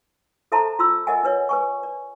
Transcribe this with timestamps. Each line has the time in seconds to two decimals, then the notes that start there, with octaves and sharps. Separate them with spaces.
0.52 A4 C5 E5 A5 A#5 C6
0.79 F4 C6 E6
1.07 A#4 D#5 E5 F#5 G#5
1.24 D4 B4 C#5 E5
1.49 B4 G#5 C#6
1.83 D5